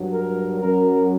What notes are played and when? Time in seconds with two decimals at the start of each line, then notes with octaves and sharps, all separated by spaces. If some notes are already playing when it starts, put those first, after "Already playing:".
Already playing: G2 F#3
0.13 A#4
0.60 F#2 F#3 A#4